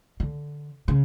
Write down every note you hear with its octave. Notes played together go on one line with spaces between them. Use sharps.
D3
C#3